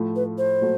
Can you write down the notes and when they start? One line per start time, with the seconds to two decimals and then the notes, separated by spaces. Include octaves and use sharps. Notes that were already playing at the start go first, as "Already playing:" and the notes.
Already playing: A2 F3 A3
0.16 B4
0.38 C5
0.61 A#2 F#3 A3